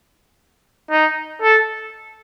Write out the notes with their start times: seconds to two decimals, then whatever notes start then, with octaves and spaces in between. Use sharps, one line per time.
0.91 D#4
1.42 A4